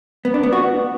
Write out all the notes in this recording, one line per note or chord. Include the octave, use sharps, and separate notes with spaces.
B3
D4
B3
F#4